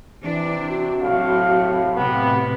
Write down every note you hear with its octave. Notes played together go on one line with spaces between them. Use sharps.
C3 E3 D4
F#4
A2 C3 F#3 F5
A2 C3 B3 G4